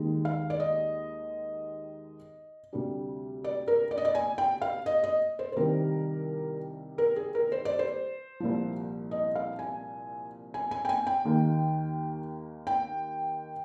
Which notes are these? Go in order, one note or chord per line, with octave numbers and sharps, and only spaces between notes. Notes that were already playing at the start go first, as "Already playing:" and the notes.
Already playing: D#2 D#3 G#3 D#4
F5
D5
D#5
D2 C3 G3 D4
D5
A#4
D5
D#5
D5
G#5
G5
F5
D#5
D#5
C5
C5
C2 C3 D#3 G3 A#4
A#4
G#4
A#4
C5
D5
C5
C2 A#2 F3
D#5
F5
G#5
G#5
G#5
G5
G#5
G5
D#2 D#3 A#3
G5